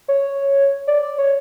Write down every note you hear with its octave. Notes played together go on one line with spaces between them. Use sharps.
C#5
D5
D5
C#5